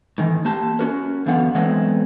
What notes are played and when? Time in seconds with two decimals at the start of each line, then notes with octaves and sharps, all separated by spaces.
0.18 A2 D#3 E3
0.45 A#3 G4 A5
0.79 C#4 F#4 A#4
1.26 F#2 D3 E3 B3 F5 F#5
1.55 E3 F#3 G#3 A3 B3 C4